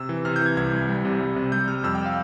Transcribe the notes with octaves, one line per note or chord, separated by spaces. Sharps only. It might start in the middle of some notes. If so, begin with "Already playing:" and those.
Already playing: C3 E6
E3
C3 F6
G6
E3 G#6
C2 G#6
C2
G3
C3
G3
C3
G3 G6
G3 F6
F2 E6
G5
F5